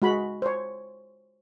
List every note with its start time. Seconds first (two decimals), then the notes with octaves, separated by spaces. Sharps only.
0.02 G#3 F#4 B5
0.42 C5 C#5